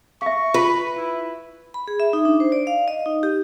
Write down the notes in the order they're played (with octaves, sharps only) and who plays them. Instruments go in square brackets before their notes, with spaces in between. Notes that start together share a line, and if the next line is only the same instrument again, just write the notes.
[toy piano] E5 F5 [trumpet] C#6
[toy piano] F4 B5 [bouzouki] B4
[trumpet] E4
[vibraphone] B5
G#4
E5
D#4
D4
C5
D5
F5
D#5
D#4
G4